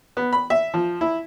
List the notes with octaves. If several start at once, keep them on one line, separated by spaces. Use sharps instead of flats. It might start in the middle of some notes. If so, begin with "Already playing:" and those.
B3
B5
E5
F3
E4